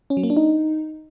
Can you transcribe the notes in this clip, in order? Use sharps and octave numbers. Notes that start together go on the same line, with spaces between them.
C#4
F#3
A#3
D4
D#4